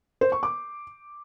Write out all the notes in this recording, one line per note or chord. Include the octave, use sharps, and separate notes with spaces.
C5
C#6
D6